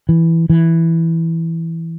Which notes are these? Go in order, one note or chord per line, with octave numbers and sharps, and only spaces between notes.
E3
E3